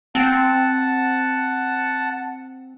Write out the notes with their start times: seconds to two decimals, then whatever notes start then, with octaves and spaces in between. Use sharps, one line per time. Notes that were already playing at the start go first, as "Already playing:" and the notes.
0.15 C4 F#5 A5